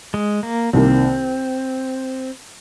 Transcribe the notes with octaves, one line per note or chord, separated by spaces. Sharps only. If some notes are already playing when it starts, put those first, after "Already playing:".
G#3
A#3
C2 C3 D#3 A#3 C4